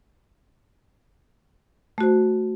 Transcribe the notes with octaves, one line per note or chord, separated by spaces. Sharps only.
A3 F#4 C5